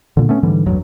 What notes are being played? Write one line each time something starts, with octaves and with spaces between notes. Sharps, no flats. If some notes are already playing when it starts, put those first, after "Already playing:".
A#2 D3
A3 B3 C#4
G#2 D3 E3 G3
A1 E2 G2 F#3